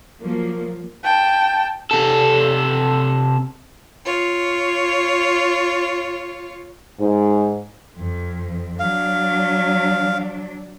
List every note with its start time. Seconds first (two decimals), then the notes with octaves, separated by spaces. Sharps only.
0.21 F3 F#3 A#3
1.04 G5 A5
1.91 C3 A4
4.05 F4 C#5
6.99 G#2
7.96 F2
8.79 F#3 D4 F5